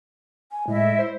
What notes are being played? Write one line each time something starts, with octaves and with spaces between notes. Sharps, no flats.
G#5
A2 G#3 E4 D#5 E5
C5